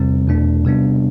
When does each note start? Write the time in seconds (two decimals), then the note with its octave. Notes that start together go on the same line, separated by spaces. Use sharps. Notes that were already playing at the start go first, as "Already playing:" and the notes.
Already playing: E2 C3 G3 C4
0.27 E2 B2 A3 D4
0.65 C3 G3 B3 D4